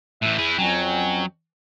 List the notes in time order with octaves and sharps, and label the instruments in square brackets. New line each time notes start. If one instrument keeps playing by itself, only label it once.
[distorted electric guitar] A2 E3 [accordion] E5 F#6 G6
[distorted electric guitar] E4 G#4
[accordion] F2 C#4 G5 [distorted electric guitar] F#3